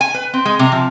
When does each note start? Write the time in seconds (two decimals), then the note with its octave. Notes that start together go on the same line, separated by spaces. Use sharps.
0.01 G#5
0.14 B4
0.34 C4
0.45 G#3
0.59 C3
0.72 F3